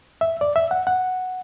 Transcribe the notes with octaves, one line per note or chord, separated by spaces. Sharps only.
E5
D5
E5
F#5
F#5